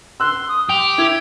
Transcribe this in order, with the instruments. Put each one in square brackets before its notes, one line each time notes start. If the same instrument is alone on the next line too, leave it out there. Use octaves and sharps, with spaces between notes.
[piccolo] C6 [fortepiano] E6 F#6
[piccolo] D#6
[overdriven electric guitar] G4 [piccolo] F7
[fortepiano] E4 [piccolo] G#6